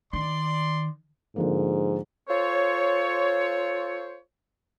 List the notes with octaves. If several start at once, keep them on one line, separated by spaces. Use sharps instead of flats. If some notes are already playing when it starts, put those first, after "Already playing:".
D#3 D5 C6
G#2 D3 F3 A#3
F4 A4 C5 C#5